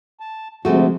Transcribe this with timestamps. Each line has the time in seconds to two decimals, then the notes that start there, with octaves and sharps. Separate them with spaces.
0.20 A5
0.65 D2 C3 F3 G#3 A3 C4 F#4